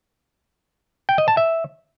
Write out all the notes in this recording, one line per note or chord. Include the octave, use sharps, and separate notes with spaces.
G5
D#5
A5
E5